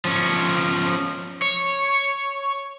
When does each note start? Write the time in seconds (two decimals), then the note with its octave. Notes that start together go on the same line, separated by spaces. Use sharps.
0.05 F3 C#4
1.42 C#5